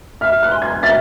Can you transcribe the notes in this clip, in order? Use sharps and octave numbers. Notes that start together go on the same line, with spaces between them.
E5 F6
F#6
G#5 C6
G#6
E5 A6